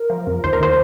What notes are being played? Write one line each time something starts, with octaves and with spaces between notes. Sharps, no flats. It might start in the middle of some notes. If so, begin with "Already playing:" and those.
Already playing: A#4
F3
F2
D#2 C5
A#4
D#3 C5